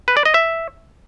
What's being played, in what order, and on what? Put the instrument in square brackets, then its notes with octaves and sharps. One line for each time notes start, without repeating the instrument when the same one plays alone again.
[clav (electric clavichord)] B4
D5
D#5
E5